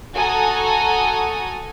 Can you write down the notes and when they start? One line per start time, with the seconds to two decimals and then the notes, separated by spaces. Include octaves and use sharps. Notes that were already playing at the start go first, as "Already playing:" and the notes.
0.15 F#4 A4 G#5 A#5 D#6